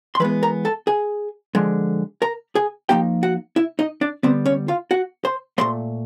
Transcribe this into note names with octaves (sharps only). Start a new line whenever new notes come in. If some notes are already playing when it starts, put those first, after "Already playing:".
C6
E3 G#3 B3 B4 B5
A#4 A#5
A4 A5
G#4 G#5
D3 F3 G#3
A#4 A#5
G#4 G#5
F3 A#3 D#4 G4 G5
F#4 F#5
E4 E5
D#4 D#5
D4 D5
D3 G3 B3 C4 C5
C#4 C#5
F4 F5
F#4 F#5
C5 C6
A#2 F3 A3 C5 C6